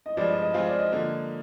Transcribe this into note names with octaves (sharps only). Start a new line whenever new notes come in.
D#5
G2 F3 G#3 D5
D#5
D#5
F3 G#3 C4 F4 G#4 F5
D5
D#5
D3 F3 A#3